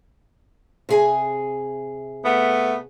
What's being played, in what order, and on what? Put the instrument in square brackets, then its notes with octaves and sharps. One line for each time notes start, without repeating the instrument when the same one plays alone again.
[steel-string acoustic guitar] C3 G#4 G#5
[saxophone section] A3 B3